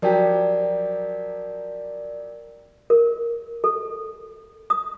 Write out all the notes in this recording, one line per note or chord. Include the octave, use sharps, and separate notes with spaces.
F3 F#3 G4 A#4 D5
A#4
A4
D#6